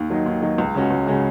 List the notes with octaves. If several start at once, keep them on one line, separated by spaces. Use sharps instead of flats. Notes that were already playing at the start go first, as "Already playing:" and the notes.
Already playing: D#2
D#3 F#3 D#4
D#2
D#3 F#3 D#4
C#2
C#3 G#3 C#4 F#4
C#2
C#3 G#3 C#4 F#4